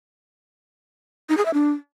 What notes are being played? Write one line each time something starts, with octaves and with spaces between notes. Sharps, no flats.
D#4
G#4
E5
D4